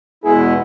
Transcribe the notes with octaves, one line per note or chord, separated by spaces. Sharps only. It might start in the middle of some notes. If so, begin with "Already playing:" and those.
E2 B2 G#3 B3 E4 G#4